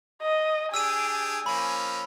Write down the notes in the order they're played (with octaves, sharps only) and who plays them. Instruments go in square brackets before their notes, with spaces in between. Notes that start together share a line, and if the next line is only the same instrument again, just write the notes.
[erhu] D#5
[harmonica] D4 G4 G#4 [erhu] G#5 [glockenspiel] E6 D#7
[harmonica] F3 A#3 C#4 [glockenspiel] B5